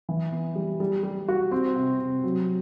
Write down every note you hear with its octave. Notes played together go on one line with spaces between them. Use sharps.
E3
B3
G3
G3
G3
F#4
C4
C3
C3
F#3